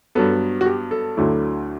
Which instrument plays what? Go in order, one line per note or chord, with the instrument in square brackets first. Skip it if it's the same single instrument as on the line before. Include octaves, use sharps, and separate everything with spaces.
[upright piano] G2 F#3 B3 A4
F#4
G4
A4
D2 D3 F#3 A3 E4